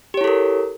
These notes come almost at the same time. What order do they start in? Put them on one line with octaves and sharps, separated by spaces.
G4 C#5 E4 A4 A#4